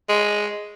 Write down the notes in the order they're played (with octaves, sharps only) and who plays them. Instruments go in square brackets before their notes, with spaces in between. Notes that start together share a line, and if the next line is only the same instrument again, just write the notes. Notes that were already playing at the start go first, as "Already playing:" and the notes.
[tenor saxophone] G#3